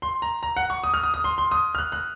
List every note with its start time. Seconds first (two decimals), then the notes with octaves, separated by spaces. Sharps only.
0.02 C6
0.22 A#5
0.43 A#5
0.57 F#5
0.70 C#6
0.84 D#6
0.94 F6
1.04 D#6
1.14 D#6
1.24 C6
1.38 C6
1.52 D#6
1.75 F6
1.78 F#6
1.92 F#6